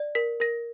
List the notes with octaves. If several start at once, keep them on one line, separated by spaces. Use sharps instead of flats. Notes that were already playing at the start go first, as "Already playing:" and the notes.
Already playing: D5
A#4 B6
A#4 A#6